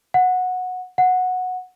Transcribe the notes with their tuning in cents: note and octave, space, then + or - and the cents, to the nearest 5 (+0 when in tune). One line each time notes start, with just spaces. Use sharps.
F#5 -15
F#5 -10